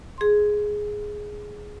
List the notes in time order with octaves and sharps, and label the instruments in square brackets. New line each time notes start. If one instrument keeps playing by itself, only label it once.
[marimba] G#4 C6